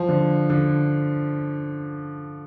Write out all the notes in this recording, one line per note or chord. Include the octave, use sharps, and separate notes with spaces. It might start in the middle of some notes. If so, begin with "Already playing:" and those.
Already playing: F3
D3
D3